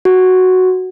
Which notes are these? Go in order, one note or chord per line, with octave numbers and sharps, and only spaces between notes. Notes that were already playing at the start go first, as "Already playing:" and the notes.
F#4